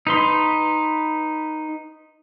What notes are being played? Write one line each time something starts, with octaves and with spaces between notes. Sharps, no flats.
D#4 B4 C6